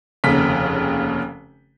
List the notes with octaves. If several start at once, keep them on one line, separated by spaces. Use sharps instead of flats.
F1 D#2 C#3 B6